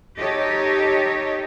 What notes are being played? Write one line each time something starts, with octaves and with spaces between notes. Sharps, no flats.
D#4 G4 A4 C#5 D#5